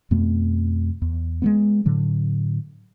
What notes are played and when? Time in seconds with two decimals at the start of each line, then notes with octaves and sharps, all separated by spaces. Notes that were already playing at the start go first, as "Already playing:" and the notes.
0.11 F2 B2 A3 B3
1.02 E2
1.42 G#3 A3 B3
1.86 A2 D3 F#3